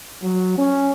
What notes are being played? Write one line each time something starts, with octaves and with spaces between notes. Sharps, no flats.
F#3
C#4